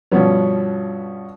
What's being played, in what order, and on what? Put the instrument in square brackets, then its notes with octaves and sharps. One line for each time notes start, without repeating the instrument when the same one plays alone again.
[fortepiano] G2 B2 F3 B3 C#4